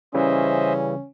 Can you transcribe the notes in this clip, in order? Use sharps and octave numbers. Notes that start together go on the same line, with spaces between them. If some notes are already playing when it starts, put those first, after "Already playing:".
C#3 E3 G3 C#4 C5 D#5 E5